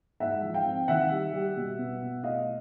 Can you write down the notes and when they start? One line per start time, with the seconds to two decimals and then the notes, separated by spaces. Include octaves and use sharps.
0.20 G#2 E5 F#5
0.42 F3
0.54 F5 G5
0.65 C4
0.88 D#3 E5 F#5
1.11 G3
1.33 G3
1.56 B2
1.79 B3
2.02 B2
2.23 A3 D#5 F5